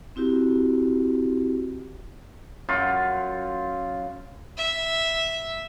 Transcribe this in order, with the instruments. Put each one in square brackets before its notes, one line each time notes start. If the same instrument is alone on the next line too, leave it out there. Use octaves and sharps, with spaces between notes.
[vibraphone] C4 E4 F#4 G4
[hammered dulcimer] F#2 F4
[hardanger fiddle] E5